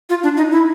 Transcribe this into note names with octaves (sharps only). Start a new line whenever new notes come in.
F4
D4
D#4
E4